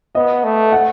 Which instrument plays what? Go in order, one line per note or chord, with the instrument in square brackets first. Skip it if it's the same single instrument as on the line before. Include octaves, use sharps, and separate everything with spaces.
[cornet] B3 [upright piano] D#5
[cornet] A3
[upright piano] F#5